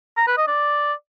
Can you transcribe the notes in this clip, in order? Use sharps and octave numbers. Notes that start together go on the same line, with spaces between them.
A#5
B4
D#5
D5